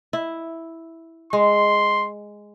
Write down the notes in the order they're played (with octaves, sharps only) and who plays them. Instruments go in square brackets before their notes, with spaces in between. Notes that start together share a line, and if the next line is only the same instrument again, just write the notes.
[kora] E4
[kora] G#3 [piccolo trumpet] C6